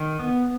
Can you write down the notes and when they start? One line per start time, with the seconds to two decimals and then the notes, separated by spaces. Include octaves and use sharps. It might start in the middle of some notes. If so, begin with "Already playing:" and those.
Already playing: D#3
0.20 B3